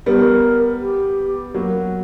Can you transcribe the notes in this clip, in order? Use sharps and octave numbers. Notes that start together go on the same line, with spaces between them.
G3 B3 A#4
G4
F#3 A#3 F#4